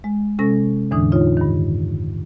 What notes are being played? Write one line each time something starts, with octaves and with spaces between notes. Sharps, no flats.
G#3
C3 G#3 C#4 A4 C#6 A#6
E2 A2 D3 E3 D4 D#6
D#4 F4 C#5
G2 D#3